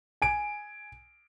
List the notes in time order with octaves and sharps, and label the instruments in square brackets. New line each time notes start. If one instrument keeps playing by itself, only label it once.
[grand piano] G#5 D7